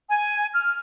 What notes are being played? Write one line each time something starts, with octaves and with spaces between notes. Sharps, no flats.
G#5
F6